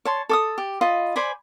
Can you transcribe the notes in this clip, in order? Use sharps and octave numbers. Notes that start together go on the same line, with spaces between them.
C#5 A5 C6
A4 D6 D#6
G4
F4 D#5 B5
C5 D5 G#5 B5